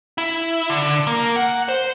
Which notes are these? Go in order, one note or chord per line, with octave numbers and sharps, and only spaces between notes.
E4
D3
A#3
F#5
C5